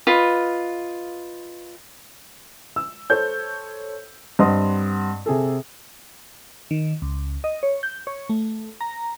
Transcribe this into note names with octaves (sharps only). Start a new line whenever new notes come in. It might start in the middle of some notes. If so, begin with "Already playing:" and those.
F4 B4 D#5
E6
A4 C5 C#5 G6
G2 C4 D#5 F#5 C6 D#6
C3 G#4 A4
D#3
C#2
D#5
C#5
G6
C#5
A3
A#5